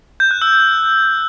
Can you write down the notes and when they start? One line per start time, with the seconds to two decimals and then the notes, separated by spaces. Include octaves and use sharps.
0.20 G6
0.31 F#6
0.42 E6